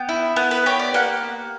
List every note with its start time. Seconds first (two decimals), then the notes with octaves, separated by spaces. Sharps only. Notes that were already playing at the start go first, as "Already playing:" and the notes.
Already playing: B3 G5
0.09 E4
0.36 B3
0.51 B4
0.66 G4 C#5
0.79 D5
0.94 A#3 F#5